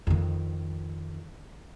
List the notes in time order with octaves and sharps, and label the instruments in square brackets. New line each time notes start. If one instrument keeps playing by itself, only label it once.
[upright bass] F2 D#3